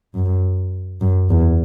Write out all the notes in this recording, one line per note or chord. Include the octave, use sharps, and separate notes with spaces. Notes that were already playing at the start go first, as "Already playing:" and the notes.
F#2
F#2
E2